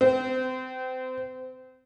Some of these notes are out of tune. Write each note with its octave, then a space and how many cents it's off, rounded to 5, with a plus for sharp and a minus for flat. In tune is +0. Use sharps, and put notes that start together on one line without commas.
C4 -30